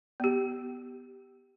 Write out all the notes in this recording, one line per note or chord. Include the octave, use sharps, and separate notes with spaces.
B3 G4